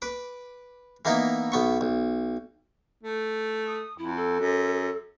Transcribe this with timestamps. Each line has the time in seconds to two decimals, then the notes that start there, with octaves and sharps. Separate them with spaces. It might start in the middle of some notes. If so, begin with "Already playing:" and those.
0.02 B4 D6
1.05 E3 A#3 B3 D#4 E4
1.52 B1 B3 C#6
1.81 B1
3.03 A3
3.66 D#6
3.98 F2 E4
4.16 A4
4.39 F#2